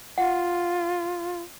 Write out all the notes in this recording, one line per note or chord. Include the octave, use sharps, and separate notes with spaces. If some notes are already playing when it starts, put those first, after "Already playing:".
F4 F#5